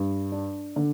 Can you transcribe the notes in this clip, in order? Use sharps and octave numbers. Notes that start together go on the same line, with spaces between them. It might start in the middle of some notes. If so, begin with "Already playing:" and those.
Already playing: G2
D4
D3